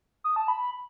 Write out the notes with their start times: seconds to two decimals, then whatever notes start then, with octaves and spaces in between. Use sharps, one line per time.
0.24 D#6
0.36 A5
0.48 B5